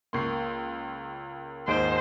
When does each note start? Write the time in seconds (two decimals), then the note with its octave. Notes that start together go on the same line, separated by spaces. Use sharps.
0.13 C#2 A#3 C6 C#6 C7
1.68 D#2 G#2 C5 D7